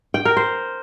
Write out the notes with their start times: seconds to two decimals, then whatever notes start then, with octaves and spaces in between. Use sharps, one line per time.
0.14 G5
0.25 A#4
0.37 C5